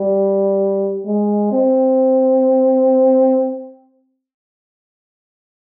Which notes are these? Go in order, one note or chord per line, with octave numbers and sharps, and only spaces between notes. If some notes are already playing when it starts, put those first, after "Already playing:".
Already playing: G3
G#3
C4